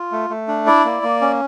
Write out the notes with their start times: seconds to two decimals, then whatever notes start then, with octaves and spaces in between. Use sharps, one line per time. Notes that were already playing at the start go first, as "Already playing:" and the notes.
Already playing: F4
0.12 A3
0.30 A3
0.48 D4
0.67 E4 D5
0.85 A#3
1.03 A#3
1.21 C#4